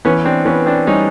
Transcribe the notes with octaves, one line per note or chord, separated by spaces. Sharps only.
E3 B3 C#4
C4 D4
E3 B3 C#4
C4 D4
G3 C#4 D#4